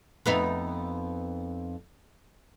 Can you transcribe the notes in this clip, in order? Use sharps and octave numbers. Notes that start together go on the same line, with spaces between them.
F2 B3 D#4